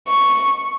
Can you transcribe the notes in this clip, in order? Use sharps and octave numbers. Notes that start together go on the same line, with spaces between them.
C#6